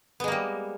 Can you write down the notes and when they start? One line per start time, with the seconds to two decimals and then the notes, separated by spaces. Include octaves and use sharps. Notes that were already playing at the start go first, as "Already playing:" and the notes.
0.20 B3
0.24 G#3
0.28 A#3
0.32 G3